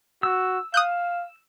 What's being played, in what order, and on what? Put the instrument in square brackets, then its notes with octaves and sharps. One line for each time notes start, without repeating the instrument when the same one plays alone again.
[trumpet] F#4 [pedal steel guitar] E6
[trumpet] F5 [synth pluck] D#6 F#6 G6